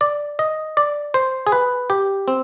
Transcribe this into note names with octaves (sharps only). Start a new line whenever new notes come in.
D5
D#5
D5
C5
G#4
B4
G4
C4